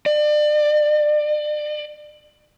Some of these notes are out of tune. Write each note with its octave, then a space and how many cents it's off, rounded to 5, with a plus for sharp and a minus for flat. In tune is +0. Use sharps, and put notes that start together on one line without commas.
D5 +35